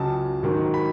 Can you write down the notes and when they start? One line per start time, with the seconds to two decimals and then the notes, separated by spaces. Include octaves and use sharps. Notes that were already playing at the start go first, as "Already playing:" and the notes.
Already playing: C#2 C#3 F#3 A5
0.43 G#2 D#3 F#3
0.74 B5